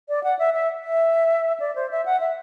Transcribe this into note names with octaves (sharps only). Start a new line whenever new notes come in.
D5
F#5
E5
E5
E5
D5
C5
E5
F#5
E5